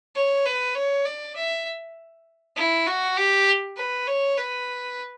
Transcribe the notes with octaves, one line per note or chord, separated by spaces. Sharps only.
C#5
B4
C#5
D5
E5
E4
F#4
G4
B4
C#5
B4